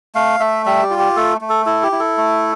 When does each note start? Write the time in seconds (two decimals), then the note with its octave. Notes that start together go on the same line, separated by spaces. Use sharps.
0.15 A3 F5
0.40 A3 E5
0.66 G3 E5
0.83 G4
0.90 F4
0.99 G4
1.16 A3 A4
1.41 A3
1.49 A4
1.66 E4 A4
1.83 G4
1.92 E4
2.00 A4
2.18 A3